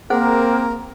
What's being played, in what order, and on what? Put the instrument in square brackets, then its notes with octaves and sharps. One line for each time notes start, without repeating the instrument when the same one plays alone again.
[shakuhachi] A#3 [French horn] C4 [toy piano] G#4 C5 F#5 [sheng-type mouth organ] A#4